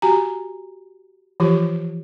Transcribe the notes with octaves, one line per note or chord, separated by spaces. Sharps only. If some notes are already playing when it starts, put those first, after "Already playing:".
F#4 G4 G#5 A#5
E3 F3 F4 G4 C5